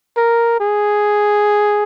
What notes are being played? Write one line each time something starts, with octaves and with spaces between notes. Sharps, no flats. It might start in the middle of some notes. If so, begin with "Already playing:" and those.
A#4
G#4